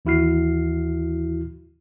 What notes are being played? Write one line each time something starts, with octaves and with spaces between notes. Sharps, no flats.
D#2 E3 E4 F#4 F6 C7